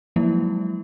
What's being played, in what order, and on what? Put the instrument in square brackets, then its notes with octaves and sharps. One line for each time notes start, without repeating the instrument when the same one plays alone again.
[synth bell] F3 F#3 G#3 A#3 E4